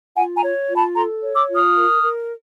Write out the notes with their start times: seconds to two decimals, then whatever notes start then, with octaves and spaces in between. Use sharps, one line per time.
0.16 F4 F#5 G#5
0.35 G#5 A#5
0.42 C#5
0.69 F4
0.76 A5 B5
0.95 A4 A#5 C6
1.22 C#5
1.35 D6 E6
1.49 F4
1.55 D#6 F6
1.75 A#4
2.01 A#4